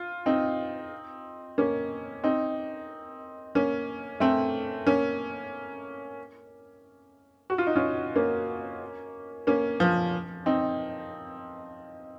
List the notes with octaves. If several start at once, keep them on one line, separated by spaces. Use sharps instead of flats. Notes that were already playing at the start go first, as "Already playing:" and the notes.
Already playing: F4
C4 D#4
A#3 C#4
C4 D#4
A#3 C#4
A3 C4
A#3 C#4
F#4
F4
D#4
C#4 F4
A#3 C#4
A#3 C#4
F3
C4 D#4